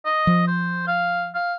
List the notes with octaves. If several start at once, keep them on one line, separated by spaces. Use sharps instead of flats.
D#5
F3
C5
F5
F5